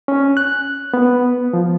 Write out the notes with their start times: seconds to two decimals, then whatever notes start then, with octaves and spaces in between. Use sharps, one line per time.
0.08 C#4
0.37 F#6
0.94 B3
1.53 F3